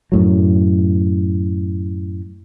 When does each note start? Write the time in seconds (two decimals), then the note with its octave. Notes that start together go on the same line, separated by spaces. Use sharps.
0.12 F#2 A2 F#3